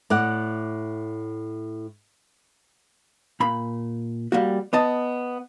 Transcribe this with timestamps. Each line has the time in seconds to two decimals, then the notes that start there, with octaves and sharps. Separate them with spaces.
0.10 A2 D5 F#5
3.40 A#2 B5
4.32 G3 A#3 F#4
4.73 B3 D#5 A5